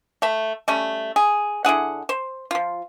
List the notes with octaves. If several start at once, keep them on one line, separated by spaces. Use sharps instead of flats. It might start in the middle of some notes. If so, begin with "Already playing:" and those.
A3 E5
G3 A3 C#4
G#4
D3 E4 G#4 F#5
C5
F3 F4